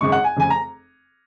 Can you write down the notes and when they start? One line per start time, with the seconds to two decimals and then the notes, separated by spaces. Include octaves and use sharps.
0.01 G#1 F#2 C#3 G#3 C#6
0.12 F#5
0.24 G#5
0.36 F1 F2 C#3 G#5
0.50 A#5